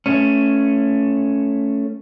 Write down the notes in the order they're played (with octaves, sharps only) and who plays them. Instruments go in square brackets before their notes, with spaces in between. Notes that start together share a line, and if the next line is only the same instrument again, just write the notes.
[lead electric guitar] A3 C#4